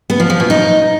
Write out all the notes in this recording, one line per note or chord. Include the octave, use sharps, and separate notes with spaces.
B3
F3
F3
B2
D#4